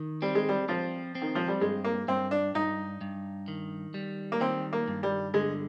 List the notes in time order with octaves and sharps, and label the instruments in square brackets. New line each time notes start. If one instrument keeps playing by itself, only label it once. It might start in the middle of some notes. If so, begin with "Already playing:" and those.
Already playing: [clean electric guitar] D#3
[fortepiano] G3 [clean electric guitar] C4
[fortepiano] G#3
G3
[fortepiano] F3 [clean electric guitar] C4
[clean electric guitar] C4
[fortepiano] D#3
F3
G3
[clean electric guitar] G2 [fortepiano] G#3
[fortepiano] A#3
[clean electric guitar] G2 [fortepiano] C4
[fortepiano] D4
[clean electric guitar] G2 [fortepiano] D#4
[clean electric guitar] G2
D#3
G3
[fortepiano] A#3
[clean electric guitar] D#3 [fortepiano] C4
[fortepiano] A#3
[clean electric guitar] G2
[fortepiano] G3
[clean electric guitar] D3 [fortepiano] G#3